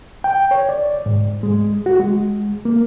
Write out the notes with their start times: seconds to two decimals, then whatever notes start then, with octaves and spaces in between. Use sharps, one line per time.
0.24 G5
0.51 C#5
0.69 D5
1.06 G#2
1.43 G#3
1.86 F#4
2.00 G#3
2.65 A#3